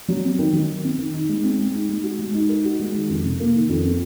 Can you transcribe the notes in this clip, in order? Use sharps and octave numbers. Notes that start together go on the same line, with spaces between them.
F#3
C4
D#3
F#3
D#3
C4
D#3
D#4
G#3
C4
G#3
D#4
G#3
F#4
G#3
D#4
A#4
F#4
G#3
D#3
F2
C3
A#3
D#3
F2
C4